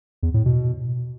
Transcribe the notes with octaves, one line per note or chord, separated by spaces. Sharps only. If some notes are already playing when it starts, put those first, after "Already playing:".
E2
A2
B2